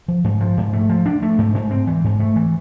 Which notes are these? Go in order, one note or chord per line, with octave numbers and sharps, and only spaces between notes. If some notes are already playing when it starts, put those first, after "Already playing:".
F3
G#2
F3
G#2
A3
F3
D4
A3
G#2
G#2
C4
E3
G#2
A3
E3